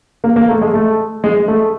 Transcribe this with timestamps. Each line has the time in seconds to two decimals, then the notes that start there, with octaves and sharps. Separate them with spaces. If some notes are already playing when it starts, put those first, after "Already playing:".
0.24 A#3
0.36 A#3
0.49 A3
0.61 G#3
0.74 A3
1.24 G#3
1.48 A3